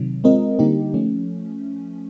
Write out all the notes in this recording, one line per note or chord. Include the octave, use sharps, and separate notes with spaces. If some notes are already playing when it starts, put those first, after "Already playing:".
Already playing: C3 D#3 F#3
G#3 C4 F4 A#4 D#5
D3 G3 A#3 D#4 G4
F3 A3 C#4